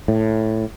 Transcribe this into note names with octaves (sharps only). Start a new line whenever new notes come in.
A2